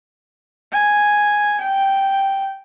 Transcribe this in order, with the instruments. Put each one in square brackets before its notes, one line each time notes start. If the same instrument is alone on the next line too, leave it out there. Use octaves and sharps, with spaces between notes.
[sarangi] G#5
G5